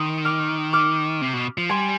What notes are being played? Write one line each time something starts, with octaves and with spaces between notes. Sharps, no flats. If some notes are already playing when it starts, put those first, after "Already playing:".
Already playing: D#3 C6 D#6
D6 F6
D6 F6
C3
B2
F3
G3 G#5 C6